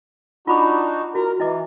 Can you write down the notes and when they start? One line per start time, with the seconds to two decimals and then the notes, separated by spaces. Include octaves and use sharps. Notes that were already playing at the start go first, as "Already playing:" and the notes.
0.47 D4 D#4 F4 F#4 B5 D6
1.15 E4 F#4 A#4
1.40 E3 E4 D#5 D6